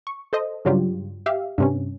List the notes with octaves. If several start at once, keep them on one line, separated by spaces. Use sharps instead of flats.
C#6
A4 C5 D#5
G2 C#3 F#3 G3 F4 G4
G4 E5 F5
G2 C3 C#4